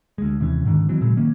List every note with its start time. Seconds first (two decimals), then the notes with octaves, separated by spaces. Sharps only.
0.18 D2 G#3
0.40 D#2 C3 E3 C#4
0.65 G#2 D3 D#3
0.88 D#3 E3 F#3 C4
1.01 A#2 C#3 F#3 G#3
1.17 D#3 A#3 C#4